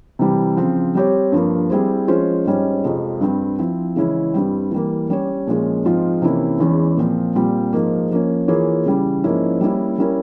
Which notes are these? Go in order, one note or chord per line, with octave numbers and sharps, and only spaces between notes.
C3 E3 G3
C#3 F3 C4
G3 C4 G4 C#5
G2 F3 A#3
G3 C4 E4 G#4 C5
F3 G#3 C#4 F4 C5
G#2 G3 C#4
F2 C3 F3 G#3
G2 G3 C4
F3 C4 E4
C#3 E3 G#3 C#4 E4
G2 G3 C4
E3 G3 A#3
G3 C#4 G4 C#5
A#2 F3 G#3 C#4
G#2 F3 C4 F4
C3 E3 A#3 C#4 E4
E2 E3 G#3 C#4
A#2 F3 C4
A#2 G3 C4 F4
G#2 F3 A#3
F3 A#3 C#4
E3 A#3 F4 G#4 C#5
C#3 E3 G3
G#2 F3 A#3 C#4 E4
G3 A#3 C#4 E4 A#4
G3 C#4 E4 A#4